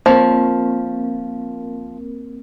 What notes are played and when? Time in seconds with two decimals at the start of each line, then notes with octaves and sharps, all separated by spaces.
0.06 F3 A#3 C4 A#4